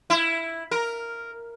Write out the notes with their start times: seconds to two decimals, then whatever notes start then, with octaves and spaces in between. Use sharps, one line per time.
0.10 E4
0.71 A#4